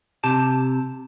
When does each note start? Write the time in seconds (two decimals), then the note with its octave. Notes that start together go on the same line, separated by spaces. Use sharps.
0.24 C3 G4 A5